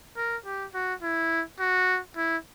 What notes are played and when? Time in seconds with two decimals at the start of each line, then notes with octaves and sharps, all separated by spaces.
0.17 A#4
0.45 G4
0.74 F#4
1.02 E4
1.59 F#4
2.17 E4